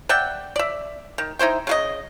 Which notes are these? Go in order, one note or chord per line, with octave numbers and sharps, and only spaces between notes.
D5 E5 F#5 G5
D5 E5
D#3
D#4 E4 C5 G5
C#3 F#4 D#5